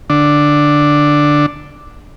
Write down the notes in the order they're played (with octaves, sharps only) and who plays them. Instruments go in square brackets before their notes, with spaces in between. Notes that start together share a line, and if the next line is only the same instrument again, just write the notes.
[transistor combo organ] D3 D4